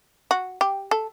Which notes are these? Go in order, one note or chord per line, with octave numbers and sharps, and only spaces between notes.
F#4
G4
A4